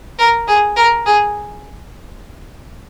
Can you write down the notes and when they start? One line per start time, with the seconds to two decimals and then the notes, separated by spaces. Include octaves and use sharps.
0.19 A#4
0.48 G#4
0.76 A#4
1.06 G#4